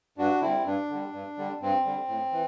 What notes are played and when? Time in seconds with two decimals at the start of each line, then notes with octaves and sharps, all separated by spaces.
0.18 G2 D4 F#4
0.41 D3 G3 C4 E4
0.65 G2 D4
0.90 D3 G3
1.13 G2
1.38 D3 G3
1.61 G2 C4
1.86 D3 G3
2.08 A2
2.32 E3